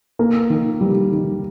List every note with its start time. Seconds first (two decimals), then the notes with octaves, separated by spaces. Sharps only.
0.19 A#3
0.50 D#3
0.81 G3
1.12 D#3